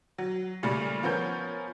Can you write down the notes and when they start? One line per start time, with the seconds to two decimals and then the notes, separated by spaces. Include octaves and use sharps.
0.18 F#3
0.63 A#2 C#3 G3 A3
1.03 F3 B3 C#4 A#4 C#5 G6